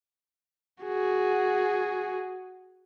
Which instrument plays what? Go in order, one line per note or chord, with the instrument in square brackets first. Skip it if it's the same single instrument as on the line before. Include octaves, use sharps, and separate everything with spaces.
[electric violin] F#4 G#4